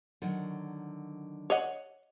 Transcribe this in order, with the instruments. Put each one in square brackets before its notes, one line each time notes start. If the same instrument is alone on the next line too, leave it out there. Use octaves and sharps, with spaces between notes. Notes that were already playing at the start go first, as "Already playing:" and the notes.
[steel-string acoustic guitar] D3 D#3 F#3
[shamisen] C#5 D#5 F#5